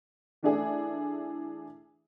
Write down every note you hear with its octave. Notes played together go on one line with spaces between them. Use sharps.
E3 A3 D4 E4 G#4